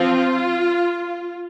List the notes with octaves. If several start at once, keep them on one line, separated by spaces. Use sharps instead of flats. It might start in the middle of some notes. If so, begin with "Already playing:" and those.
Already playing: F3 C4 F4